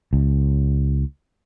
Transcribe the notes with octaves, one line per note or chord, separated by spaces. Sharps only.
C#2